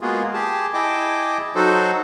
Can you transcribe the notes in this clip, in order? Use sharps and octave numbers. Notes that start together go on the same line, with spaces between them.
G#3 A#3 B3 F4 F#4 G#4
G4 G#4 A5
E4 G#4 D#5 G5 A5 D6
F#3 D#4 F#4 A4 C5